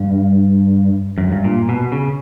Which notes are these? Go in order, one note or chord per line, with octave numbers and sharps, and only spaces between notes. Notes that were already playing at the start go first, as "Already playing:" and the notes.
Already playing: G2
F#2
G2
A#2
B2
C#3